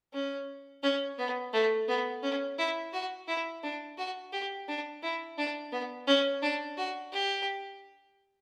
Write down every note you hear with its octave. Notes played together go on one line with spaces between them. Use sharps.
C#4
C#4
B3
A3
B3
C#4
E4
F#4
E4
D4
F#4
G4
D4
E4
D4
B3
C#4
D4
F#4
G4